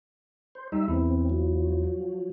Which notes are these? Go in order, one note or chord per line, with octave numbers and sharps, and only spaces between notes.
C5
G3 D#4 E5
E2 C4 E4
F3 F#3